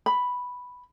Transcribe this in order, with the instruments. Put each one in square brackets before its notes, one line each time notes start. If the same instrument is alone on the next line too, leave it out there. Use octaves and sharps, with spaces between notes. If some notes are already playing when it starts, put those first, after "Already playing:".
[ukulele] B5